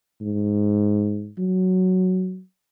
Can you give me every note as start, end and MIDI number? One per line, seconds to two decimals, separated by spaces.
0.21 1.31 44
1.38 2.40 54